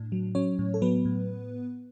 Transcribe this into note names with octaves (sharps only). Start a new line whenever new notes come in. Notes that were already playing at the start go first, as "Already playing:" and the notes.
Already playing: A2 D4
F#3
F#3 C#4 C#5
A2
A4
F#3 B3 B4
A2